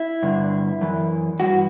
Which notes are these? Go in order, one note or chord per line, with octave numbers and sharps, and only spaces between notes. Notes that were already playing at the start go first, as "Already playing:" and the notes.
Already playing: E4
G2 D3
F#2 E3
G2 E3 F#4